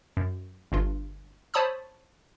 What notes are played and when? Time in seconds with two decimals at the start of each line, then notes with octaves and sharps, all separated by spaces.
0.17 F#2
0.72 G1 G2 F4
1.54 C5 C#5 A5 B5 D#6 E6